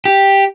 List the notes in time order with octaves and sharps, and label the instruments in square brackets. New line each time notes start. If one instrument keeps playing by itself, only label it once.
[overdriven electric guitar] G4